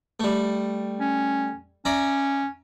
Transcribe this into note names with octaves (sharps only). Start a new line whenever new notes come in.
G3 A3
C#4
C#4 D5 E5 A#5